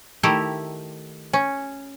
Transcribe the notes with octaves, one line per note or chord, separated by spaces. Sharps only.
D#3 A3 E4 G4 A#5
C#4